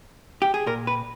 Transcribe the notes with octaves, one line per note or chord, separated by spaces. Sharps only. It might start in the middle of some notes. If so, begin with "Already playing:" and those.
G4
G#4
A#2 A#4
B4